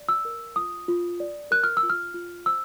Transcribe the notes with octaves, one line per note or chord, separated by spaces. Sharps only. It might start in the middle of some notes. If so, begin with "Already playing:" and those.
Already playing: D5
E6
A#4
F4 D#6
F4
D5
A#4 F#6
F6
E6
F4
F6
F4
C5 E6